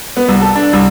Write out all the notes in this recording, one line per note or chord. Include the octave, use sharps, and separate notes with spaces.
B3
C2
A4
D4
C2